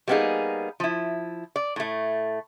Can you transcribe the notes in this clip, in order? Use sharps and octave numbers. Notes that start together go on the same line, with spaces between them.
G3 A#3 B3 C#4 D#4 G#4
F3 E4
D5
A2 A3